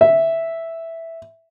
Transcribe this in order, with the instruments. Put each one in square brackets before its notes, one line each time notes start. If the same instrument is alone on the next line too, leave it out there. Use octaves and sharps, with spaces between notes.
[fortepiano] E5